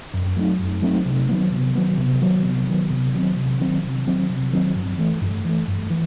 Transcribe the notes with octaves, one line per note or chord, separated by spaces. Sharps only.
F#2
F#3 A3 C4 D#4
F#2
F#3 A3 C4 D#4
C3
D#3 F#3 B3
C3
D#3 F#3 B3
C3
D#3 F#3 B3
C3
D#3 F#3 B3
C3
D#3 F#3 C4
C3
D#3 F#3 C4
C3
D#3 F#3 C4
C3
D#3 F#3 C4
G2
E3 A3
G2
E3 A3
G2
E3